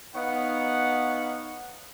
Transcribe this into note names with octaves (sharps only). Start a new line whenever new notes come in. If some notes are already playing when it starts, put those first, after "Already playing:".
B3 D#4 C#5 F5 F#5